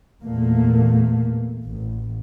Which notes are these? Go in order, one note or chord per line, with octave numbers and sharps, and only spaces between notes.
E2 A#2 A3 A#3
A1